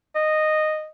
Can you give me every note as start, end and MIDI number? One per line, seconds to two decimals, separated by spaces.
0.15 0.88 75